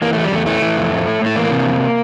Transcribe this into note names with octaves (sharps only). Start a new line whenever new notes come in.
E3 A#3
E2 A3
G3
E2 A3
E3 A3
E3
F2
A2
A2
A2 A3
E3 A#3
C3
F2